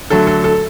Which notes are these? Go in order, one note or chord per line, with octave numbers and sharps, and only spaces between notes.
D3 F#3 A3 A4
A4
A4